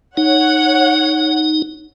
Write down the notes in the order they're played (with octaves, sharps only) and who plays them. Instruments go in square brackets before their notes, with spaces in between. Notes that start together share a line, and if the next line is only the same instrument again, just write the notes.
[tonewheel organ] D#4 [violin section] C#5 F#5